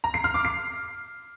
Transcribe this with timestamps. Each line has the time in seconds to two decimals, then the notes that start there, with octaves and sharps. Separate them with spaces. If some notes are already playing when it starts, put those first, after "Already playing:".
0.04 A#5
0.14 C7
0.24 F6
0.34 D6
0.45 C7